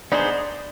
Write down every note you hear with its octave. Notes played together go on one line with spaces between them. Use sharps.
B3 D4 D#4 G#4 C5